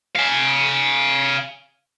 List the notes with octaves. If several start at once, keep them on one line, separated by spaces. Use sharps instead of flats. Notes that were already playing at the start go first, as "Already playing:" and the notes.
F5 G#5